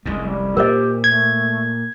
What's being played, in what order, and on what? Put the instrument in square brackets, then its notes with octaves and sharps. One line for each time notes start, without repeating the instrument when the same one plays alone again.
[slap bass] F1 C2 F#2 [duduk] G#3
[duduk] G3
[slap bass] A#2 A#3 [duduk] G4 [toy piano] A#4 C5 D#5
[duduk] A3 [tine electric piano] G#6